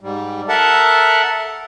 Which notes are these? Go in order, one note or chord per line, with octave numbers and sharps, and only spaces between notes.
G#2 G3
A4 A#4 E5 F#5 A5